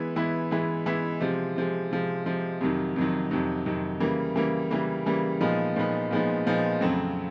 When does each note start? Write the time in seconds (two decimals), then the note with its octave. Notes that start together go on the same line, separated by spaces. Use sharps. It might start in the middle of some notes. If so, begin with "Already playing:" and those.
Already playing: E3 G#3 B3 E4
0.16 E3 G#3 B3 E4
0.51 E3 G#3 B3 E4
0.86 E3 G#3 B3 E4
1.21 C3 F3 G#3
1.56 C3 F3 G#3
1.91 C3 F3 G#3
2.26 C3 F3 G#3
2.61 F2 C3 D#3 F#3
2.96 F2 C3 D#3 F#3
3.31 F2 C3 D#3 F#3
3.66 F2 C3 D#3 F#3
4.00 C#3 E3 G3 A#3
4.36 C#3 E3 G3 A#3
4.71 C#3 E3 G3 A#3
5.06 C#3 E3 G3 A#3
5.41 A#2 F3 G#3 B3 D#4
5.76 A#2 F3 G#3 B3 D#4
6.11 A#2 F3 G#3 B3 D#4
6.46 A#2 F3 G#3 B3 D#4
6.81 F2 C#3 F#3 A3 C4